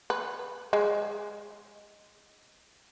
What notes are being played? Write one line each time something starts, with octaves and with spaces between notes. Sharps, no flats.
B4
G#3